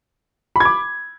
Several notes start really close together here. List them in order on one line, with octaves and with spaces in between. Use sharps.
B5 G#6 D6